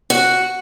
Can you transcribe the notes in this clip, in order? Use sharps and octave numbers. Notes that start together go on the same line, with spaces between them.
F#4